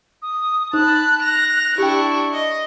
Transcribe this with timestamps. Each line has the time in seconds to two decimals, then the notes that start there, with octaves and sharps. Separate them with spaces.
0.22 D#6
0.73 D#4 A5 B5 F#6
1.23 A#6 F7
1.78 D4 E4 G4 G5 C#6
2.33 D#5